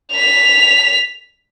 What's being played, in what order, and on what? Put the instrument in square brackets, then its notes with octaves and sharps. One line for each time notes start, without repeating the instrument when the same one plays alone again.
[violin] B6 F7